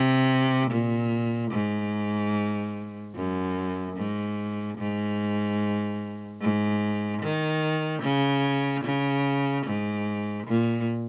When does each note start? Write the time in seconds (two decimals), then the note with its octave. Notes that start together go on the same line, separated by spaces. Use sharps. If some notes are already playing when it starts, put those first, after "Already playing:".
Already playing: C3
0.71 A#2
1.52 G#2
3.15 F#2
3.96 G#2
4.78 G#2
6.41 G#2
7.22 D#3
8.03 C#3
8.84 C#3
9.66 G#2
10.47 A#2